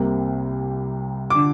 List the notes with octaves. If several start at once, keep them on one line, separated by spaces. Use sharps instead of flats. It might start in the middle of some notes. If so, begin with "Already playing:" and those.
Already playing: C2 C3 A#3
D3 D6